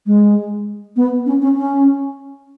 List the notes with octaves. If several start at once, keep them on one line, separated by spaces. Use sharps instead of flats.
G#3
B3
C#4
C#4
C#4